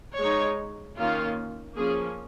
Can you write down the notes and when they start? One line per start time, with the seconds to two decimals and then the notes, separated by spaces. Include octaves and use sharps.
0.18 G#3 D#4 C#5
0.98 D#3 A#3 C#4 F4
1.78 F3 A#3 C#4 G#4